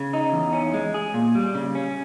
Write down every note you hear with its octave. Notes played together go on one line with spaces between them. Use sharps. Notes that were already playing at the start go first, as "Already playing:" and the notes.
Already playing: C#3
D#4
E2
C#4
G#3
G#4
A#2
G3
C#3
C#4